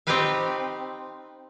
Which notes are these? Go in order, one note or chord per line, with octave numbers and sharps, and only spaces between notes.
C4 D#4 F4 G4 B4 F5